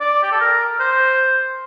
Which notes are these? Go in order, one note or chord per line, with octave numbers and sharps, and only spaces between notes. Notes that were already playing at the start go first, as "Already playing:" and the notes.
D5
G4
A4
A#4
C5